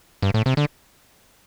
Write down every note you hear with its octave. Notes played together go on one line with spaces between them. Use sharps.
G2
A2
C3
D3